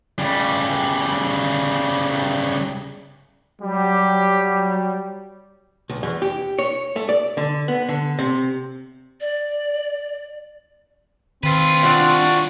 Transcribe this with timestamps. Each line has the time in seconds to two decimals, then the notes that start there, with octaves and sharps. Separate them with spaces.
0.19 C#3 G3
3.62 F#3 G3 G4
5.89 B1
6.03 E2
6.22 G4
6.58 C#5
6.96 A3
7.09 D5
7.37 D3
7.68 B3
7.89 D3
8.19 C3
9.21 D5
11.43 D#3 C4 F4 B4
11.83 C2 D4 F4 F#4